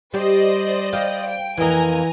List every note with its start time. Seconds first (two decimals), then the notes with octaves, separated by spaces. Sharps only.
0.14 G3 G4 C5 D5 D#5
0.93 G3 F5
1.28 G5 D7
1.58 F2 E3 A#3 D#5 G#5 A#5